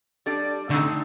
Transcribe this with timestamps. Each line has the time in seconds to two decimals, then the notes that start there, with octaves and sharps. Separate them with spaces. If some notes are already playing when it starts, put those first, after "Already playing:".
0.26 G3 D4 A4 D5
0.70 D3 A3 C4 D#4